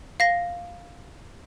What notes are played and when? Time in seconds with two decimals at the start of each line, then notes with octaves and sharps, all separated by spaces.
0.20 F5 A#6